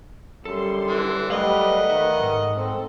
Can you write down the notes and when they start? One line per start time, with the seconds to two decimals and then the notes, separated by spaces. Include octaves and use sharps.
0.45 F#2 D3 G3 A4 C6
0.88 E3
1.30 F#3 G3 A3 A#4 B4 D#5 F5 F#5
1.90 D#3 E5
2.20 D#2 G#2
2.57 C4 A4